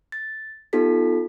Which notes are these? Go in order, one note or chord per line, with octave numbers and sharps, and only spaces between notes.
A6
B3 D#4 F4 G4 A4 B6